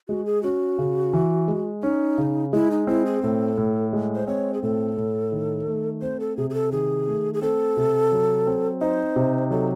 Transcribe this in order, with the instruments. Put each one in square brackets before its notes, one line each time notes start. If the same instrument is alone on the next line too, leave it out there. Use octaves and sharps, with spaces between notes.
[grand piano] G#3 [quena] F#4
[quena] G#4
[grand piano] C#4 [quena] F#4
[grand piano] C#3
E3
G#3
[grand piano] C#4 [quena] D#4
[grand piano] C#3
[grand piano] G#3 [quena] E4
[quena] D#4
[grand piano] C4 [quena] E4
[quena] G#4
[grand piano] A2 [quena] A4
[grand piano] A2
G#3
[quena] C5
[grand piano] C4 [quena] C#5
[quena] G#4
[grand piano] A2 [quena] A4
[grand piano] A2
D#3
A3
[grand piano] C4 [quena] C5
[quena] A4
[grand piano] C3 [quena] G#4
[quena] G#4
A4
[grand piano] D#3 [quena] G#4
[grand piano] A3
[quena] G#4
[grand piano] C4 [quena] A4
[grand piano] C3
F#3
C4
[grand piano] D#4 [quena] C5
[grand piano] C3
[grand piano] F#3 [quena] A4